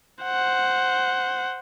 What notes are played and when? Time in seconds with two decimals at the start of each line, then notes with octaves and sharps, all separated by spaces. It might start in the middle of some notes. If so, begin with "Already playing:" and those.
0.23 C5 F#5